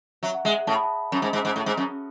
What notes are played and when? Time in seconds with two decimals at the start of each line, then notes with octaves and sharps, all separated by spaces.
0.23 F#3 E5
0.34 F#5
0.45 G#3 E5
0.67 A2 A5
0.75 B5
0.84 A5
1.12 F#2
1.22 G#2
1.33 G#2
1.45 G#2
1.56 A2
1.66 G#2
1.77 F#2